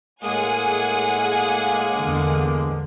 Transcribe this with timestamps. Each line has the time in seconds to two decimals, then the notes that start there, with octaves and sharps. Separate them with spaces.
0.23 A2 G#3 A#3 G#4 F#5 G#5
1.98 E2 D3